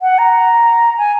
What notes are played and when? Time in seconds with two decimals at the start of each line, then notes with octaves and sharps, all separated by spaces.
0.02 F#5
0.18 A#5
0.98 G#5